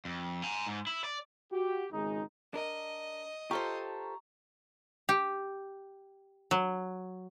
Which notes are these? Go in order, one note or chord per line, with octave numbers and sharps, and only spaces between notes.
F2
G#5 A#5
G#2
E4
D5
F#4 G4
G#1 C#2 G#3 D#4
D4 A#4 D#5
F4 G4 A4 C5 A#5 C#6
G4
F#3